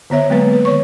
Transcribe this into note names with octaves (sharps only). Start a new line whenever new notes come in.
D3 B3 C#5 E5
F#3 G#3 A#3 B3 B4
B4
D#3 C#5 C#6